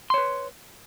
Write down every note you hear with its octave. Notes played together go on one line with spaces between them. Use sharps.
B4 C#5 C6